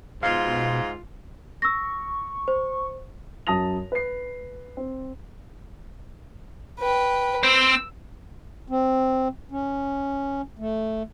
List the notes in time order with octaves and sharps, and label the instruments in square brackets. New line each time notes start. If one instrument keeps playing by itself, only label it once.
[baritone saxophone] G#2 [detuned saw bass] B2 [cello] F4 [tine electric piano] F5
[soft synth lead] C#6 [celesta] E6 A#6
[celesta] C5
[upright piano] F#2 A5 D#6 A#6 F7
B4 C7
C4
[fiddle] B4 G5
[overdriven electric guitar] C4 C5 [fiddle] E6
[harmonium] C4
C#4
A3